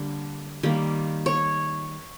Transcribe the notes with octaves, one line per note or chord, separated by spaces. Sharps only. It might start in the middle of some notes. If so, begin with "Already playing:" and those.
Already playing: D3 G3 A#3
D#3 G3 A#3
C#5